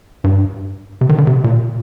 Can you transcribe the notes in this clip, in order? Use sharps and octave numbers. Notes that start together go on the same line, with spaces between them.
G2
C3
D#3
D3
C3
A#2